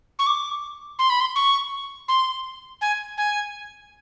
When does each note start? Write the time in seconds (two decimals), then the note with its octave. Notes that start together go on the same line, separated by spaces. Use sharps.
0.19 C#6
0.27 D6
0.99 C6
1.10 B5
1.20 C6
1.36 C#6
2.08 C6
2.81 G#5
3.18 G#5